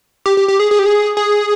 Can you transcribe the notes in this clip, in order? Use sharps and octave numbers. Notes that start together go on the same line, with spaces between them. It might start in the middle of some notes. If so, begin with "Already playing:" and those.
G4
G4
G4
G#4
G#4
G4
G#4
G#4